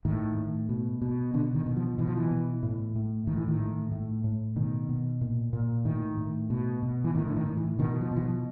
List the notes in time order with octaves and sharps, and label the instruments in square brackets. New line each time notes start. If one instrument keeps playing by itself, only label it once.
[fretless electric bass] A2 D#3
A2
B2
B2
B2 D3
D#3
B2
F3
B2 E3
F3
E3
B2
A2
A2
A2 D#3
E3
D#3
A2
A2
A2
B2 D#3
B2
A#2
A#2
A2 D#3
A2
B2
B2
E3
A2 D#3
D3
D#3
A2
E3
B2 D#3
F3
B2
E3
F3